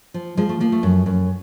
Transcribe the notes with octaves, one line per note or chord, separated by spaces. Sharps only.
F3
F3 G#3
A3
F3 A#3
A3
F#2
F#2